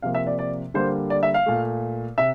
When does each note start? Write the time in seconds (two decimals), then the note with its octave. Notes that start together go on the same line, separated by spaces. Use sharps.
0.02 C3 F3 A#3 F5
0.15 E5
0.27 D5
0.39 D5
0.74 D3 G3 A#3 C5
1.10 D5
1.23 E5
1.34 F5
1.46 A#2 A3
2.18 C3 E5